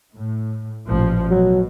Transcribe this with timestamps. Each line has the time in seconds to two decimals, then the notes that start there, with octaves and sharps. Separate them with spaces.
0.15 A2
0.88 A1 A#2 F3
1.31 B2 F#3